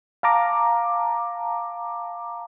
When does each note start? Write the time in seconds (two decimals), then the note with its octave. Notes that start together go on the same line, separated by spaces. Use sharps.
0.23 F5 A5 A#5 D6